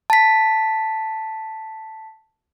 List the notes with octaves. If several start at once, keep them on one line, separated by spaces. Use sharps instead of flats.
A5 B6